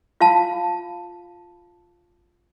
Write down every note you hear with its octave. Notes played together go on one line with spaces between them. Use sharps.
F4 F5 A5